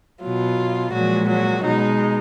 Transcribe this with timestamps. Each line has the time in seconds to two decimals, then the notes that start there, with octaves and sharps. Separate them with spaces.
0.21 B2 F#3 F4
0.92 A#2 F3 F#3 G#3 F#4
1.28 F#3 F#4
1.64 B2 G#3 D#4